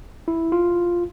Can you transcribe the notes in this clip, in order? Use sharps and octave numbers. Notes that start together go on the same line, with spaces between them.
E4
F4